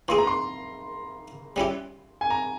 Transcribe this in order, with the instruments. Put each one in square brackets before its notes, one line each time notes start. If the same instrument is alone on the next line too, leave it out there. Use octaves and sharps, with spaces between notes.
[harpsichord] E3 A#3 E4 G#4 [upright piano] C6
[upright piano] A#5
C6
[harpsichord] G3 C#4 E4 G4
[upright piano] G#5
A#5